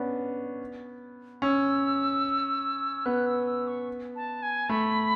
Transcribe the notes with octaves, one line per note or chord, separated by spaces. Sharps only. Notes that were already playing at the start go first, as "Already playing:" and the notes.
Already playing: B3 C#4 D4
C#4 E6
B3 F#6
E6
E6
C#6
A5
G#5
A3 B5